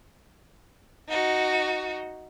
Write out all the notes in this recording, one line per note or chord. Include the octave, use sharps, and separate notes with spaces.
D#4 F#4